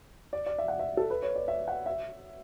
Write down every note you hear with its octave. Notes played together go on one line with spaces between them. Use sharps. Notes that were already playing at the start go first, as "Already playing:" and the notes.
D5
D5
E5
F#5
E5
A4
B4
C#5
D5
E5
F#5
E5